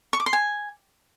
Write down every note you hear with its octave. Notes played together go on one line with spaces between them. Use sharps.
C#6
D6
C6
G#5